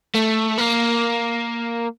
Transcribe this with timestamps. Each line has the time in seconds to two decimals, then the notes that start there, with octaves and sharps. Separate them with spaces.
0.15 A3
0.58 A#3